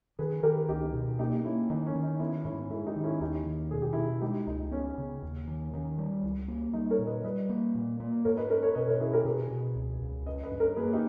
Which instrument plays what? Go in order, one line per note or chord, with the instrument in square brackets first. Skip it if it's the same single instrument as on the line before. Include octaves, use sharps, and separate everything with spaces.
[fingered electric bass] D#3 [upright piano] G#4 B4
[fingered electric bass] D#3 [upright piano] G4 A#4
[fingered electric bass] C#2 [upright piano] D#4 G4
[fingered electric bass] B2
[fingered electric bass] A#3 [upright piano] D#4 G4
[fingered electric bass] A#3 [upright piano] C#4 E4
[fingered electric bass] D#3 [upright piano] D#4
[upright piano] C#4
[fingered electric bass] D#3
[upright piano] D#4
[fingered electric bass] B3 [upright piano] C#4 E4
[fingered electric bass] G#2 [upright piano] C#4 E4
[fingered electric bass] G#3 [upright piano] E4 G#4
[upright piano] D#4 G4
[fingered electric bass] D#3
[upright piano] C#4 E4
[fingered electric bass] D#2 [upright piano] D#4 G4
[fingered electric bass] D#3
[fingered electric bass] B2 [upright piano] G#4
[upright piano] G4
[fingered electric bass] B2 [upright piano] E4 G#4
[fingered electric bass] G#3 [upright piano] D#4 G4
[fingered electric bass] C#2 [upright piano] D#4
[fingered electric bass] B3 [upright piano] C#4
[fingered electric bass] C#3
D#2
D#3
[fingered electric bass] D#3 [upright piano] C#4
[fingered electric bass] G3
C#2
A#3
[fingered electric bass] G3 [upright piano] D#4
[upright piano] A#4 C#5
[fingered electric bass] A#2
[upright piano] B4 D#5
[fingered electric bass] G3 [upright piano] B4 D#5
[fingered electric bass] A#3
A#2
A#3
[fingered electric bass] G#2 [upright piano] A#4 C#5
[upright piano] B4 D#5
[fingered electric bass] C#4 [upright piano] A#4 C#5
[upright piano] A#4 C#5
[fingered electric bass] B2 [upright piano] B4 D#5
[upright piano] A#4 C#5
[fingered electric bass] C#4 [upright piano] E4 G#4
[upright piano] G4 A#4
[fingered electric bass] B2 [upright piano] G#4 B4
[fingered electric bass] B2
C#2
C#2
[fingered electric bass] C#4 [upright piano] B4 D#5
[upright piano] B4 D#5
[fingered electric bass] G2
[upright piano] A#4 C#5
[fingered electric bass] A#3 [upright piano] G#4 B4
[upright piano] D#4 G4